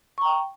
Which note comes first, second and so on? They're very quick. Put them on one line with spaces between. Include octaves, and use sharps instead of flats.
C#6 A#5 G5